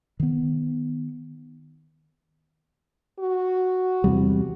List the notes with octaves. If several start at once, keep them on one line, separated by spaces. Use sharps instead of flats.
D#3 B3
F#4
E2 C3 G3